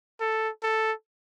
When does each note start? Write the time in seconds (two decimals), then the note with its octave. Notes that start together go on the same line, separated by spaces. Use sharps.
0.21 A4
0.63 A4